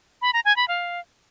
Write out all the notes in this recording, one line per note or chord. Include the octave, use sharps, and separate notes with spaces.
B5
A#5
G#5
B5
F5